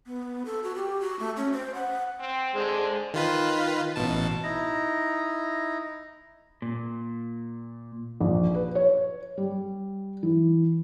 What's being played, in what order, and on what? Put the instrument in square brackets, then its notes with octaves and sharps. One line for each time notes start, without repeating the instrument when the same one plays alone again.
[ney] B3
A4
F#4
G4
F#4
A3
C#4
C5
F#5
[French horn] C4
[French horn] D3 [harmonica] G#3 G#4 C5
[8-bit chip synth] D#3 F4 B4
A1 B2 A5
[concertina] D#4 E4 A#5
[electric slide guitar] A#2
[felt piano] A#1
B4
C#5
G3
E3